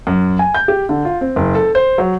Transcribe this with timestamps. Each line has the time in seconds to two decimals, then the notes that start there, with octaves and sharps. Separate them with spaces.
0.07 F#2
0.39 G#5
0.55 G6
0.68 G4
0.89 D3
1.05 F4
1.21 C4
1.36 F#1
1.55 A4
1.75 C5
1.98 F#3